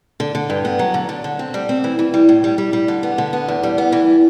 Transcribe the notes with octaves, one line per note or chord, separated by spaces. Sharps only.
D3
D3
G2
B3
F#3
D3
D3
D3
C4
G3
C4
E3
E3
G3
A2
G3
G3
G3
D3
B3
D3
B3
E2
G3
B3
E3